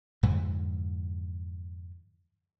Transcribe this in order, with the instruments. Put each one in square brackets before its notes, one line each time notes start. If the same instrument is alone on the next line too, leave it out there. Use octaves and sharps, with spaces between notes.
[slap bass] F2 G#2 D3 E3